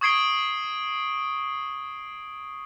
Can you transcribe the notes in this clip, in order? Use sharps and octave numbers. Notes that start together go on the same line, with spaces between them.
C#6 D#6 G#6 C7 D7 G7